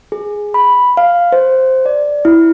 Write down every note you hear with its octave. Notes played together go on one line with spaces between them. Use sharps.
G#4
B5
F5
C5
D5
E4